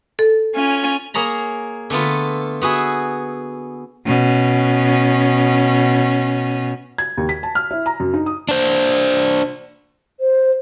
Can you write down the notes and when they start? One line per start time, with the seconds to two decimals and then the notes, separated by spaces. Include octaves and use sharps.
0.19 A4
0.55 C#4 F4 G#5
1.14 A#3 G#4 C#5 A#5 B5
1.90 D3 A3 B3 F4
2.62 B3 F#4 G#4 E5
4.06 B2 C#4
6.98 G#6
7.17 D#2
7.29 B6
7.43 A5
7.55 F6
7.71 E4
7.86 A#5
8.00 F#2
8.14 D#4
8.26 D#6
8.49 D4 C5
10.20 C5